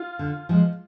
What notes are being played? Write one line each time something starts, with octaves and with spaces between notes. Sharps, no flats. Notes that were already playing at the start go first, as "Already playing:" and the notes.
Already playing: F4
D3
F3 G#3